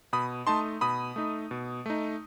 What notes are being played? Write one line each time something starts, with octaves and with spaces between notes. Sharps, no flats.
B2 B5 D#6
A3 D#4 A5 C6
B2 B5 D#6
A3 D#4
B2
A3 D#4